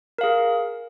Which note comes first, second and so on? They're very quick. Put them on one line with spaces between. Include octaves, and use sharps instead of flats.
A#4 F5 G#4